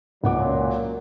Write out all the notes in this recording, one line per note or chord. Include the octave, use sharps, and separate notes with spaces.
C#2 A#2 F#3 F#5 D6